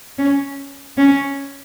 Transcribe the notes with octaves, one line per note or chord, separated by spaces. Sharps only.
C#4
C#4